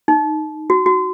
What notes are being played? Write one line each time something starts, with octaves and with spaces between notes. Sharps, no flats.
D#4
F#4
F#4